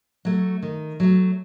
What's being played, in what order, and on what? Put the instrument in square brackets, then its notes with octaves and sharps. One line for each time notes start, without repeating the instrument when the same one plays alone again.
[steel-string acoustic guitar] F#3 A3
D#3
F#3 A3